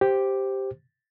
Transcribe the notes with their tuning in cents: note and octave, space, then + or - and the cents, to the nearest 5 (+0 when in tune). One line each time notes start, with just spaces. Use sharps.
G4 +0 C5 +0